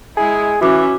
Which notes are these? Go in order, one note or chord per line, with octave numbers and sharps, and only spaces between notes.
G#3 E4 G#4
E3 C#4 F#4 E5 D6 F#6